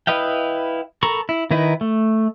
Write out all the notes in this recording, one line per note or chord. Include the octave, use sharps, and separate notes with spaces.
E4 B4 D#5 F5 G5
A4 A#4 A#5 B5 C#6
E4
D#3 D#4 E4 B4
A3